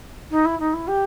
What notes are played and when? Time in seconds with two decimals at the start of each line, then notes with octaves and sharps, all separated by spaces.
0.30 D#4
0.45 E4
0.59 D#4
0.73 E4
0.87 G4